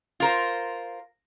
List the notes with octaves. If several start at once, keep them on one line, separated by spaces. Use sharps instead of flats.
F4 A#4 C5